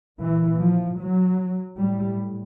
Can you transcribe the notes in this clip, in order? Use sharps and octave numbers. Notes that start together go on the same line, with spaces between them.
A#2 E3
F3
F#3
A2 G3